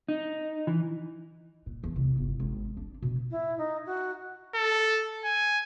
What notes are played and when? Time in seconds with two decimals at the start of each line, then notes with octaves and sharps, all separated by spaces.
0.09 D#4
0.67 E3
1.66 A#2
1.84 E2
1.96 C2
2.18 G1
2.40 G#1
2.77 D4
3.02 B2
3.31 E4
3.58 D#4
3.86 F#4
4.55 A4
5.25 G#5